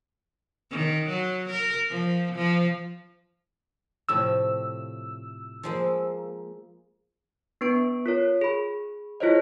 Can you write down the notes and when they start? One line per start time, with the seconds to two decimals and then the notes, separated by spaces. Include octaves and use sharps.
0.71 D#3
1.08 F#3
1.50 A#4
1.90 F3
2.36 F3
4.09 A2 C3 F3 E6
5.63 F3 G#3 A#3
7.61 B3 D4 B4 C#6 D7
8.06 F4 A#4 C#5
8.41 G#4 B5
9.20 E4 F4 G#4 C5 C#5 D#5